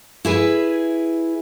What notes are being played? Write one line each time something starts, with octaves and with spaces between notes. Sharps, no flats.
E4 G#4 B4